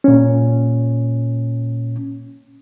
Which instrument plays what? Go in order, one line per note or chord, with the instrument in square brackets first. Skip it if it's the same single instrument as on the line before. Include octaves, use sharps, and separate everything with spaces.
[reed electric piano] A#2 C#4